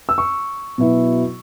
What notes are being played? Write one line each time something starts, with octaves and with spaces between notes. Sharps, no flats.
E6
C#6
B2 F#3 B3 E4